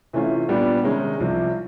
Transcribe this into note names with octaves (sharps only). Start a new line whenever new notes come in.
C3 E3 A3 C#4 F4
A#2 G3 B3 D4 G4
C3 D#3 G#3 C#4
C2 C3 F3